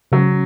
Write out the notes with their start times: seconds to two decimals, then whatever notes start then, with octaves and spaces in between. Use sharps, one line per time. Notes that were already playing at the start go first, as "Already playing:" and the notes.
0.12 C#3 F#3